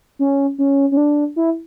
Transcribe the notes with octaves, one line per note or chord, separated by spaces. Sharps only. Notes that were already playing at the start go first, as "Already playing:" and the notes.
C#4
C#4
C#4
D4
E4